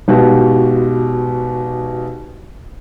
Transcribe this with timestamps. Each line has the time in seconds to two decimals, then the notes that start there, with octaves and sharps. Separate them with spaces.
0.08 G#1 B2 F#4 G4